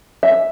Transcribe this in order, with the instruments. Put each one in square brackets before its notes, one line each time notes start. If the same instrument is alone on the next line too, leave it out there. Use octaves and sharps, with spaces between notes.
[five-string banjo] E5